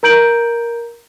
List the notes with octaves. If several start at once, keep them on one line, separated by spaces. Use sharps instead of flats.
A#4 A#5 G6 D7 F#7